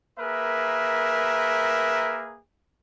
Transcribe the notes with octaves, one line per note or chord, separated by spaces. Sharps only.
A#3 G#4 A#4 B4 E5